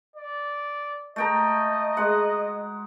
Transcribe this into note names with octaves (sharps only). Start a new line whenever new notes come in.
D5
A3 D#5 G5 A#5
G#3 F#5